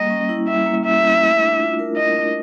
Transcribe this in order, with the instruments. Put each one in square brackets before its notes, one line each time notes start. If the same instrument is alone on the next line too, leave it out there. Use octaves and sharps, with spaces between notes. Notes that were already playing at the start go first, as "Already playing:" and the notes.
Already playing: [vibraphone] G3 A#3 [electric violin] D#5
[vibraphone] C#4
E4
[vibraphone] G3 [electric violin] E5
[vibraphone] A#3
[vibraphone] C#4 [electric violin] E5
[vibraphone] E4
A3
D4
F4
A#4
[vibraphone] A3 [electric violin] D#5
[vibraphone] D4